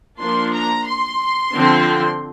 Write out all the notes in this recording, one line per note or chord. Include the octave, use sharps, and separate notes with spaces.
F3 A#3 D4 C6
A#5
C6
D3 F3 C4